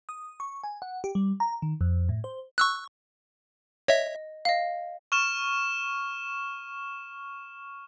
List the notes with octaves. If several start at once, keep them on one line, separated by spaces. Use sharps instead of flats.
D#6
C#6
G#5
F#5
G4
G3
A#5
D#3
F2
A2
C5
C#6 E6 F#6
C#5 D#5 E5
D#5 F5
C#6 F6 E7